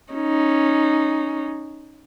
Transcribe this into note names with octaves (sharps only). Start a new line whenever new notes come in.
C#4 D#4